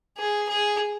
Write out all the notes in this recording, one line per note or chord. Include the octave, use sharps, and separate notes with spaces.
G#4
G#4